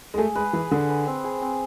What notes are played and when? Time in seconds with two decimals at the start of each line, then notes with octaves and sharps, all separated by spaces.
0.14 G#3
0.17 A3 G#4
0.35 G#3 B4
0.53 E3 G#4
0.71 D3 G#4
0.89 B4
1.07 C4
1.24 G#4
1.41 C4